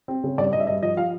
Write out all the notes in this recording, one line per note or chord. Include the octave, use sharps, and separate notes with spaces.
C4
C#3
G2 D5
G2 D#5
E5
G2 D#5
F3 D#5
F3 F5